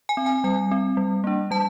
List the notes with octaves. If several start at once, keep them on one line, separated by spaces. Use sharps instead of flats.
G#5
C4
G#5
G3 G#5
C4
G3
A#3 D4
G3 A5